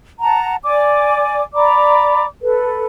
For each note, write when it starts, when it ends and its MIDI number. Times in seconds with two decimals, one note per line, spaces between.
0.20 0.55 78
0.20 0.55 81
0.20 0.55 82
0.63 1.42 74
0.63 1.42 80
0.63 1.42 86
1.54 2.24 74
1.54 2.24 82
1.54 2.24 83
1.54 2.24 86
2.42 2.85 69
2.42 2.85 71